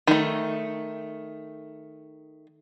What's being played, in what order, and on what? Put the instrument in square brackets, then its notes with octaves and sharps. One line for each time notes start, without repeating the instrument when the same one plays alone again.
[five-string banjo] D#3 A3